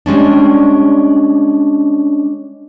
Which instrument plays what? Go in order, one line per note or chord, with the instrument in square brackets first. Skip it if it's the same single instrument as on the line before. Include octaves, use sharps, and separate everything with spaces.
[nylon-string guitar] G3 G#3 C#4 D4